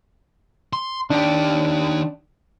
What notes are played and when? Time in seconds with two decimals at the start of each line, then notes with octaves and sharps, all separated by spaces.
0.73 C6
1.10 D#3 D4 G4